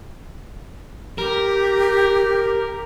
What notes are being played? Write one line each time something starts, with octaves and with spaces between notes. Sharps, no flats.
G4 A#4